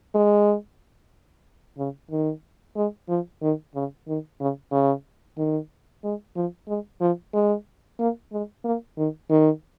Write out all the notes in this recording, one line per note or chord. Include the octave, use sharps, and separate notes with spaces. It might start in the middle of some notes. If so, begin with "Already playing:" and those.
G#3
C#3
D#3
G#3
F3
D#3
C#3
D#3
C#3
C#3
D#3
G#3
F3
G#3
F3
G#3
A#3
G#3
A#3
D#3
D#3